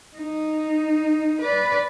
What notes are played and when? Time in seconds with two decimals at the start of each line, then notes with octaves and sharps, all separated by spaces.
0.17 D#4
1.41 B4 D5